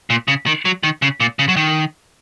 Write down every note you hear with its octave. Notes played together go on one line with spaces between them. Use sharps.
A#2
C#3
D#3
F#3
D#3
C#3
A#2
C#3
F#3
D#3